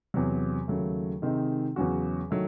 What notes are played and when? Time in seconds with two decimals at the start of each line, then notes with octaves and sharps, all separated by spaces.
0.14 E2 C3 F#3
0.68 D#2 C#3 F#3 A3
1.22 C3 D#3 G#3 C4 D#4
1.76 E2 C#3 F#3 C#4 F#4
2.31 D#3 F#3 A3